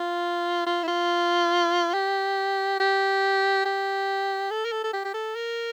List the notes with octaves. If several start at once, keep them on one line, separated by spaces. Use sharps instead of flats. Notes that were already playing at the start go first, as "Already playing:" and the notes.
Already playing: F4
F4
E4
F4
G4
G4
G4
A4
A#4
A4
A4
G4
G4
A4
A#4